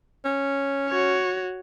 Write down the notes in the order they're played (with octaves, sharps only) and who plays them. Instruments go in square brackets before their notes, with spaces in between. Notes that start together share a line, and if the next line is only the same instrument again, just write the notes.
[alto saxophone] C#4
[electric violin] F#4 C#5